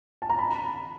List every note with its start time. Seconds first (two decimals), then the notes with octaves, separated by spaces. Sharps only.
0.22 A5
0.30 A#5
0.39 B5